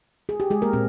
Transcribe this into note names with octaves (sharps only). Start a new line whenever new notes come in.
G#4
G4
G#3 G#4
A#3 A#4
A#2 C4